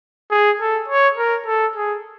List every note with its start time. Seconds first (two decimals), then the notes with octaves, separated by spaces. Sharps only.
0.31 G#4
0.60 A4
0.88 C#5
1.17 A#4
1.46 A4
1.76 G#4